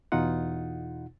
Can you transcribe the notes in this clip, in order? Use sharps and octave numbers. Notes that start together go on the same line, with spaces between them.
E2 B2 D#4 F4 F#5